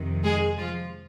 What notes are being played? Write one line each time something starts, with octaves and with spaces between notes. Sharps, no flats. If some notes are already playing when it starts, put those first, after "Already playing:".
Already playing: F2 C3 D#3
G#3 G#4
F3 F4